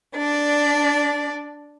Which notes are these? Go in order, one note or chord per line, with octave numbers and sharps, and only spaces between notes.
D4 D5